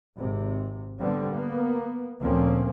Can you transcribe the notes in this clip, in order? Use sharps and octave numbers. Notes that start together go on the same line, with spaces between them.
G#1 C3
D3 G3 B3 C4
A#3 B3
D2 A#2 F3 A#3 C4 C#4